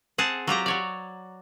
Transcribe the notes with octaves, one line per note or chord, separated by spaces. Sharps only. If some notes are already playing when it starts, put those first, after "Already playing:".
C4 G#4 F#5 A5
F#3 F4 G4 A#5
F#3 C#5 D5